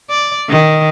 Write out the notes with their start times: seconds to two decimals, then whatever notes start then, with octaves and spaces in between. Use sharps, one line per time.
0.10 D5
0.49 D#3